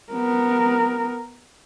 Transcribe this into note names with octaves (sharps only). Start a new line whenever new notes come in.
B3 A#4